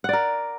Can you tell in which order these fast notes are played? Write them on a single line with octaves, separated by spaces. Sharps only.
F#5 D5 A#4